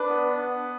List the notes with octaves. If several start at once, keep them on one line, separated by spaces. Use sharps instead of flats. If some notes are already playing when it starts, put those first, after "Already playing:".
Already playing: D4 B4
B3
B3